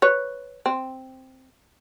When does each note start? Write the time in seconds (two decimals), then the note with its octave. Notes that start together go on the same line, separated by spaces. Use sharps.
0.02 B4 C#5
0.66 C4